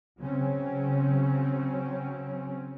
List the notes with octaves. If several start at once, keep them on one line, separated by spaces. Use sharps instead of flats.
C#3 F#3 C4 C#4